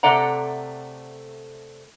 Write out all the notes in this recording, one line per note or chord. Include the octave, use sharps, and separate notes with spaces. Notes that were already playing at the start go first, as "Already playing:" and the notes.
C3 A3 A4 D5 F#5 A#5